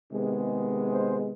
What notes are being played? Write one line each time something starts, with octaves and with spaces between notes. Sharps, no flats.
C3 D#3 G#3 B3
C5